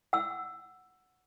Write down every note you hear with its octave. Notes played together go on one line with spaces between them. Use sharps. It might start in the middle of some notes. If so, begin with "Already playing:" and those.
F#5 E6